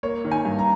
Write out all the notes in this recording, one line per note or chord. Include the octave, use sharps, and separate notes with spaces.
A#3 C#5
D#3
G#5
G2
A#5